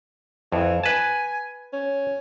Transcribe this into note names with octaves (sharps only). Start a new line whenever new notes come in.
F2 E3
B4 G#5 A5
C#4